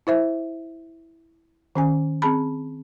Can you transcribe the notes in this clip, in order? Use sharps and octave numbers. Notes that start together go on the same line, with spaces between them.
E4 C5 E5
D#3 C#4 G#5
C4 G#4 A5 B5